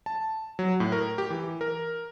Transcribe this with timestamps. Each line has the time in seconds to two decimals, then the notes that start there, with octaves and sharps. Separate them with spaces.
0.06 A5
0.59 F#3
0.80 A2
0.92 A#4
1.18 G4
1.30 E3
1.61 A#4